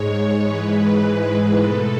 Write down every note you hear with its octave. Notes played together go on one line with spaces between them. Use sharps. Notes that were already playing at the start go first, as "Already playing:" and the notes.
Already playing: G#2 G#3 C#5
G#2 E3 G#3 B4
B2 A3 A4